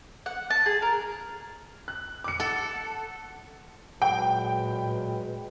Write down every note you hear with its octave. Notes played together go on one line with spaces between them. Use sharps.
F#5
A5
G#4
A#4
F#6
D6 C#7
A4 F#5
A#2 F#3 G#3 B4 G5